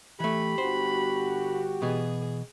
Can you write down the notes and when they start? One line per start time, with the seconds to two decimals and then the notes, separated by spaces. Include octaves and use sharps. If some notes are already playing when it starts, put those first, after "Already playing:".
0.20 E3 A3 G4 B5
0.58 G1 F#4 C5
1.82 B2 E3 B3 G#4